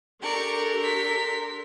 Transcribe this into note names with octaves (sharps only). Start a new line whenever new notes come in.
D4 G4 A4 A#4 D5 C#6
C6 B6